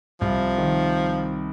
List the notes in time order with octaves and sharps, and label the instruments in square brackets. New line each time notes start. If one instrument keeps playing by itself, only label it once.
[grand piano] C2 [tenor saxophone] F3
[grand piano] D#3